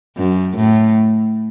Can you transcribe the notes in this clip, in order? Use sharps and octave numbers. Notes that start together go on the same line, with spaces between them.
F#2
A2